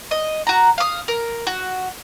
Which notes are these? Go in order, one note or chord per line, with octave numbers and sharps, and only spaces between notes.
D#5
F#4 A#5
F5 D#6
A#4
F#4